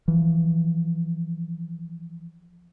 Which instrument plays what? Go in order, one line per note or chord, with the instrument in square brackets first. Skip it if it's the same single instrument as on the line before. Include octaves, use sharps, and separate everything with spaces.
[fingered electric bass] E3 F3